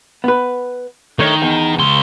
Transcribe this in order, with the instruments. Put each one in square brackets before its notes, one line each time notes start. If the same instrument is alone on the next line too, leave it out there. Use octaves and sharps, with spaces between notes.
[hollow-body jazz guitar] B3 B4
[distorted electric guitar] D#3 [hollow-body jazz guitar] A3 D4 C#5
[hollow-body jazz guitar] E2
[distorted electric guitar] C#2 C6